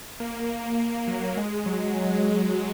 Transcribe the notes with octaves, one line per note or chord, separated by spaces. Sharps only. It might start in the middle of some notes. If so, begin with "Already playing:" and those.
A#3
A#3
A#3
F#3
G#3
F#3
F#3